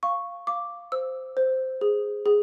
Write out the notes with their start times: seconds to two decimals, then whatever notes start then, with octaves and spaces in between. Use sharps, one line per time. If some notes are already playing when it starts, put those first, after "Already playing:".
0.03 F5 C#6
0.47 F5 D6
0.92 C5 E6
1.37 C5
1.81 G#4
2.26 G#4